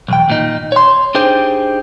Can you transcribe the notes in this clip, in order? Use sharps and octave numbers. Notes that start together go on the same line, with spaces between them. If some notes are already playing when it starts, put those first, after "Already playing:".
B1 E2 G5
D#2 A#2 D#4
C#5 C6
D4 D#4 G4 G#4 C5